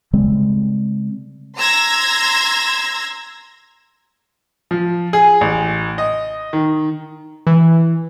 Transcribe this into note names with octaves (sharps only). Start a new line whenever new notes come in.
C#3 G3 G#3 C4
A#5 C6 E6 G#6 A#6
F3
G#4
A1
D#5
D#3
E3